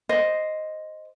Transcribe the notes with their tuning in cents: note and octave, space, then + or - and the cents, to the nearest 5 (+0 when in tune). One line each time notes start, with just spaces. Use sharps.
C5 -5 D#5 +0